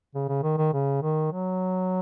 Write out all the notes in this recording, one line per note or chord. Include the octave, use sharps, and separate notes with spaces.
C#3
C#3
D#3
D#3
C#3
D#3
F#3